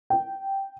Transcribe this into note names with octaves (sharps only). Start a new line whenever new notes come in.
G5